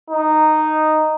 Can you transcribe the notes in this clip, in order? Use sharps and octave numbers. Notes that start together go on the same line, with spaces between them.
D#4